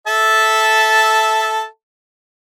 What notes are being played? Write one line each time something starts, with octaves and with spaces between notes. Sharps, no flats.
A4 E5 A5